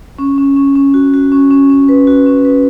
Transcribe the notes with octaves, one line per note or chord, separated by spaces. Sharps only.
C#4
C#4
C#4
C#4
F#4
F#4
C#4
C#4
C#4
B4
F#4
C#4
B4